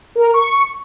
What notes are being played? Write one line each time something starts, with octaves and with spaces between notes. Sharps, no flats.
A#4
C#6